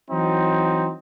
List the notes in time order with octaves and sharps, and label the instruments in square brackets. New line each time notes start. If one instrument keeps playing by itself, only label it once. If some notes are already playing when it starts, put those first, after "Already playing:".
[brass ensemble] E3 F#3 C4 D#4